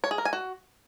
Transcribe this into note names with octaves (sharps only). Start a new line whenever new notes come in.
C#5
G#4
A#4
G#5
F#4